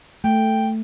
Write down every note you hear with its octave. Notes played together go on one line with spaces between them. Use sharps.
A3 G5